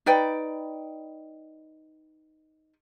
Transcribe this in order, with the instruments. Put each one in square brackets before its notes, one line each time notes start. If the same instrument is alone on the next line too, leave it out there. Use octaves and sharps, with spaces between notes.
[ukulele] D#4 B4 D5 G5